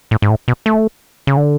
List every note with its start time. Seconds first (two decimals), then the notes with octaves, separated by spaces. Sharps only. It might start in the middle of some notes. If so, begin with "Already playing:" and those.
0.11 A2
0.22 G#2
0.30 A2
0.48 B2
0.66 A3
1.27 C#3
1.37 D3